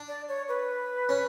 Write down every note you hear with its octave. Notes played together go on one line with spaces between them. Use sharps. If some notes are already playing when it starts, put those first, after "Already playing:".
Already playing: D4
D5
C#5
B4
C#4